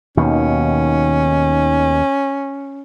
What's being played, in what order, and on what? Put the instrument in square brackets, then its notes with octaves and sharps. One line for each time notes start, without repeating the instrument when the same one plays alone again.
[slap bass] D#2 B2 D#3 [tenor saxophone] C#4